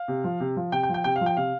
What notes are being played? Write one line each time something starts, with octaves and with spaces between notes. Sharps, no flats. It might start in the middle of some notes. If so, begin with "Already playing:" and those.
Already playing: F5
C3
F3
C3
F3
C3 G5
G5
F3
G5
C3 G5
F5
F3
G5
C3 F5